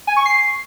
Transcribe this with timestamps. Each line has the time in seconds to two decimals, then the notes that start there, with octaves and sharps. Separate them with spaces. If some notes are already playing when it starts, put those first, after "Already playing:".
0.07 G#5
0.16 C#6
0.25 C7